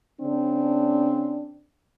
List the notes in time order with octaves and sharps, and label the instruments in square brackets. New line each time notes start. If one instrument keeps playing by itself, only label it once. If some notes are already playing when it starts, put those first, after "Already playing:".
[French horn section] C#3 C4 D4